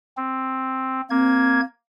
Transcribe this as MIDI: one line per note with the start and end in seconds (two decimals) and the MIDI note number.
0.17 1.01 60
1.10 1.61 58
1.10 1.61 60
1.10 1.61 92